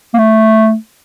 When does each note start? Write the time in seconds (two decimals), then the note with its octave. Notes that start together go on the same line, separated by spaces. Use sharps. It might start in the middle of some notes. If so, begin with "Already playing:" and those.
0.14 A#3
0.19 A3